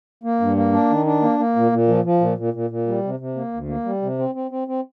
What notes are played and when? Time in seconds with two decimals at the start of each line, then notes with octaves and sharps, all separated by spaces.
0.24 A#3
0.40 G2
0.56 A#3
0.72 D4
0.90 D#3
1.06 D4
1.22 A#3
1.39 A#3
1.56 A#2
1.72 A#2
1.88 F3
2.05 F3
2.21 A#2
2.38 A#2
2.54 A#2
2.70 A#2
2.87 G3
3.03 C3
3.20 C3
3.36 A#3
3.53 D2
3.68 A#3
3.85 G3
4.02 C3
4.19 C4
4.35 C4
4.51 C4
4.68 C4